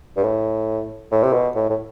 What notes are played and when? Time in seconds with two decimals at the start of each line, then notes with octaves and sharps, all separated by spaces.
0.17 G2
0.24 A2
1.12 A2
1.23 C3
1.33 B2
1.55 A2
1.70 A2